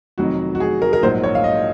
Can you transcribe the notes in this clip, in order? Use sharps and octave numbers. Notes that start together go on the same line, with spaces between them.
F1 F2 D#3 F#3 F#4
F#4
G#4
A#4
A#4
A#1 G#2 F#3 C5
C#5
F5
D#5